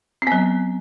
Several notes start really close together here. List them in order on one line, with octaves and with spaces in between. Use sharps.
C4 B3 F#3